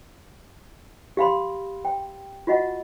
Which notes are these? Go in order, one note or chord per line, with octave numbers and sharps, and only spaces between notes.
G4 F5 B5 C6
G5
F4 F#4 D#5 F#5